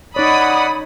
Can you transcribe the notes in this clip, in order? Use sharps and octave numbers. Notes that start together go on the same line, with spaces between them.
D#4 C#5 D5 F#5 B5 D#6